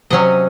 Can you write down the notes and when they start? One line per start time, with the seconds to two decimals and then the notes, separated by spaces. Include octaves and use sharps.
0.10 C3 F#3 C#4 D#5